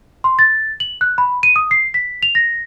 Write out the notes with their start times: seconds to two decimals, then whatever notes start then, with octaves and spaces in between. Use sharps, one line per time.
0.24 C6
0.39 A6
0.80 F#7
1.01 F#6
1.18 B5
1.43 D#7
1.56 D#6
1.71 C7
1.94 B6
2.23 F7
2.35 A#6